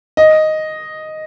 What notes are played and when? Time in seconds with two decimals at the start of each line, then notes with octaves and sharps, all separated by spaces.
0.17 D#5